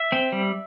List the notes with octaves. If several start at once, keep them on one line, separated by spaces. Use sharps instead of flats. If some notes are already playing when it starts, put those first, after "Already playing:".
Already playing: E5
C4
G3